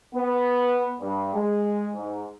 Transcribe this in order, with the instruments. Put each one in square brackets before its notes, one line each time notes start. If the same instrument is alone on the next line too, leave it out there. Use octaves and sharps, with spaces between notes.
[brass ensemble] B3
G2
G#3
G#2